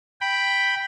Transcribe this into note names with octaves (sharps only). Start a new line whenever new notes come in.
G5 B5